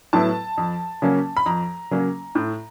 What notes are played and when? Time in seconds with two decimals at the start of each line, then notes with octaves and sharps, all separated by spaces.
0.13 A2 F#3 B3 E4 A5
0.58 F2
1.02 C#3 F#3 A#3 C#4
1.37 B5
1.46 F2 A#5
1.91 C#3 F#3 A#3 C#4
2.35 A2